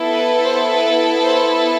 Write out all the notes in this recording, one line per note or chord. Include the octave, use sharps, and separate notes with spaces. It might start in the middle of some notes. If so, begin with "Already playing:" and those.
Already playing: B3 E4 A4
B4
C5
B4
C5